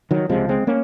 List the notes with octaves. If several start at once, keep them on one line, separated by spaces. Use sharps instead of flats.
D#3 F#3
C#2 C3 F3 G#3
G#3 C4
A#3 C#4